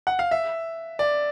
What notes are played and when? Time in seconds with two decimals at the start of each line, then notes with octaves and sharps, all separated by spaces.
0.07 F#5
0.19 F5
0.31 E5
0.99 D5